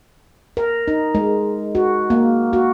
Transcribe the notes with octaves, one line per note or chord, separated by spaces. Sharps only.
A#4
D#4
G#3
F#4
A#3
F#4